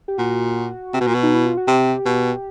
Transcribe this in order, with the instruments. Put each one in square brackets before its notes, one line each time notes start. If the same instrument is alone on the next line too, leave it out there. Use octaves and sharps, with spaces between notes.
[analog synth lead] G4
[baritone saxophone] A#2 [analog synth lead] F#4
[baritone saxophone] C3
B2
A#2
B2
[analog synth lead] D#4
E4
F4
F#4
[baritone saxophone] C3 [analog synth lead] G4
[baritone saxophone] B2